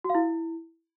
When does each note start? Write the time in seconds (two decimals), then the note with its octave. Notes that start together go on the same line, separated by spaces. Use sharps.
0.04 F#4
0.10 F5
0.15 E4